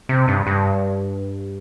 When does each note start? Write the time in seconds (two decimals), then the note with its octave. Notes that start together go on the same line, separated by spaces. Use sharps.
0.09 C3
0.28 G2
0.47 G2